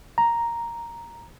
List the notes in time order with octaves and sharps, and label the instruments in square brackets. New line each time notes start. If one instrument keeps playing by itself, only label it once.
[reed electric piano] A#5